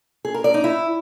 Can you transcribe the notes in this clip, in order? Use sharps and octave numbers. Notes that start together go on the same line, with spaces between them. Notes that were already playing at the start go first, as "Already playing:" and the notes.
G#4
A#4
D5
D#4
E4